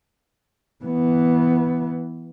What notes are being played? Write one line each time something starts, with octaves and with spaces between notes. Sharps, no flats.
E3 B3